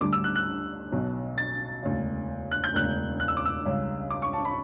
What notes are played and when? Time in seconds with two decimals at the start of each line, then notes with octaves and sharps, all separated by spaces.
0.01 D2 D3 G3 D6
0.13 E6
0.24 F#6
0.36 F#6
0.92 B1 B2 F#3
1.38 A6
1.83 E1 D2 C#3
2.51 F#6
2.64 G6
2.74 E1 D2 C#3 F#6
3.20 F#6
3.28 E6
3.37 D6
3.45 E6
3.65 C#2 C#3 G3
4.10 D6
4.22 C#6
4.33 A5
4.45 B5